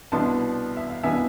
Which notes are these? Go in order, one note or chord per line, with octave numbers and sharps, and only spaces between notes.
C2 B2 B3 D4 A5 C6
E5
F5
C2 B2 B3 D4 E5 G#5